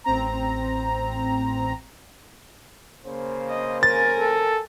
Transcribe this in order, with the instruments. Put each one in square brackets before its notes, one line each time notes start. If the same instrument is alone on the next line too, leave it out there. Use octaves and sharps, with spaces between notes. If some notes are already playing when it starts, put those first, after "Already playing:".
[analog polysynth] A1 C4 A#5
[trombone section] C#3 A#3 C5
[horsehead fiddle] D#5
[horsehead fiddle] A#4 G#5 [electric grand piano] A6
[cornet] A4